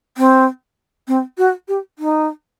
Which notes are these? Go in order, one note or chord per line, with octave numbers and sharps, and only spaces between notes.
C4
C4
F#4
G4
D#4